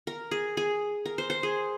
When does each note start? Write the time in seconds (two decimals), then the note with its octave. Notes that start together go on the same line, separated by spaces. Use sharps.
0.07 A#4
0.31 G#4
0.57 G#4
1.05 A#4
1.18 C5
1.30 C5
1.43 G#4